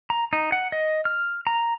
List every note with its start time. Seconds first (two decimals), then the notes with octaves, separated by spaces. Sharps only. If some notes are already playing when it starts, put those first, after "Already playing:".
0.10 A#5
0.33 D#4
0.52 F#5
0.72 D#5
1.05 F6
1.47 A#5